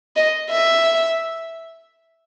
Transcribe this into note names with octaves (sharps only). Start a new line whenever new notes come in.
D#5
E5